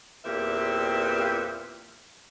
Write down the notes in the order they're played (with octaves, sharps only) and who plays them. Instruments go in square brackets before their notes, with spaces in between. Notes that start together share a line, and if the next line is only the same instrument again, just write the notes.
[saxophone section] E2 A#2 C4 G4 B4 E5